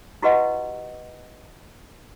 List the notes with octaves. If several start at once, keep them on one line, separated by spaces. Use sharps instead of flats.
E4 F#4 G4 B4 D#5 F#5